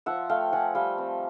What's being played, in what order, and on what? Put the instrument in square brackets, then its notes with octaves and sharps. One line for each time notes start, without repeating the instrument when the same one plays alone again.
[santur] F3 E5 F#5
A3 F5 G5
F3 F#5 G#5
G3 F5 G5
C4